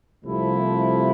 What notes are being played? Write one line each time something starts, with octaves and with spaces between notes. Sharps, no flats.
C2 C3 F3 A3 E4